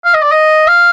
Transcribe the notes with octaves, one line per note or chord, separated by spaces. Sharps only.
F5
D#5
D5
D#5
F5